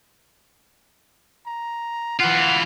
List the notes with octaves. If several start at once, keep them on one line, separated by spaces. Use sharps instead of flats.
A#5
E3 F4 F#5